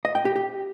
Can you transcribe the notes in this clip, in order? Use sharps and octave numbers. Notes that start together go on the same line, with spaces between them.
D#5
G5
G4
G4